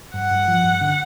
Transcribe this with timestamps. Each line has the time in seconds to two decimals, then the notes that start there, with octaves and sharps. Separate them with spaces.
0.14 G2 F#5
0.31 G2
0.48 F3
0.64 G2
0.81 D3